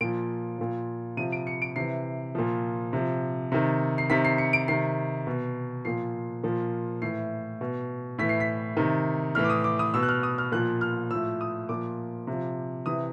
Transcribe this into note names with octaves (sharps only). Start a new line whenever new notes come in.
A#2 F3 D7
A#2 F3
C3 F3 D#7
D7
C#7
D7
C3 E3 C7
A#2 F3
C3 F3
C3 D#3
C7
C3 D#3 B6
C7
C#7
D7
C3 D#3 C7
B2
A#2 F3 C7
A#2 F3
A2 E3 C7
B2
A2 E3 B6
C7
B6
C3 D#3
A2 E3 F6
D6
D#6
D6
D#6
B2 E6
F#6
F6
D#6
F6
A#2 F3 F#6
F6
A2 F3 E6
D#6
A#2 F3 D6
C3
F3
C3 E3 D#6